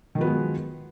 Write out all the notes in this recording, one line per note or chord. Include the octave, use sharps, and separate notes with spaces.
D#3 F3 F#3 G#3 B3